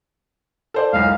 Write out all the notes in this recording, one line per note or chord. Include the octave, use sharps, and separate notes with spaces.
A4 C5 D5
E1 B1 F5